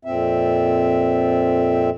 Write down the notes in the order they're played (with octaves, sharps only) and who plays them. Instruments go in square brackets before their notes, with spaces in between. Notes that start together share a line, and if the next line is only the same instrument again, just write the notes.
[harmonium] F2 A#2 C4 E5